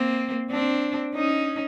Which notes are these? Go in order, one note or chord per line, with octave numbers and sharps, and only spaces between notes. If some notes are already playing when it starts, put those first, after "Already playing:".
Already playing: A#3 C4
C4 D4
C#4 D#4